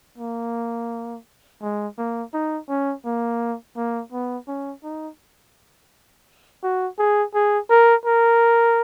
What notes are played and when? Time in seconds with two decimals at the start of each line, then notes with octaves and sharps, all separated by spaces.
0.18 A#3
1.62 G#3
1.98 A#3
2.34 D#4
2.69 C#4
3.05 A#3
3.77 A#3
4.12 B3
4.48 C#4
4.84 D#4
6.63 F#4
6.99 G#4
7.34 G#4
7.70 A#4
8.06 A#4